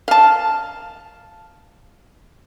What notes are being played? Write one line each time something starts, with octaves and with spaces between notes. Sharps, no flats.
F5 A5